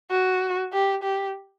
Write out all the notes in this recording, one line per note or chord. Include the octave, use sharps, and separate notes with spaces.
F#4
G4
G4